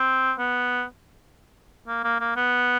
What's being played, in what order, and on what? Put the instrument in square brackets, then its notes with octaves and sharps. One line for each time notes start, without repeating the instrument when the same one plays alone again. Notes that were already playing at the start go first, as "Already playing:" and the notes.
Already playing: [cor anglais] C4
B3
A#3
A#3
A#3
B3